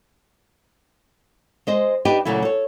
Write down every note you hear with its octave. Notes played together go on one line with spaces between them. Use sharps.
G#3 C5 D#5
D4 D#4 G4 B4 D#5
A#2 C#3 F#3 A3 E4
A4 C#5